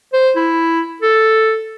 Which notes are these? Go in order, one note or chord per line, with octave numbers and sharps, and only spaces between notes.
C5
E4
A4